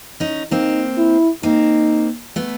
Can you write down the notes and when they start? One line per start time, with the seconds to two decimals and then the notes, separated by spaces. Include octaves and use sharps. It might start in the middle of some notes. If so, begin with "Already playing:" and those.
0.20 C#4 D#4
0.51 A#3 C4 D#4
0.97 E4
1.43 A#3 C4 D#4
2.36 A3 B3